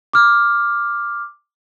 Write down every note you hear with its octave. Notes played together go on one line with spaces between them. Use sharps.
D6 F6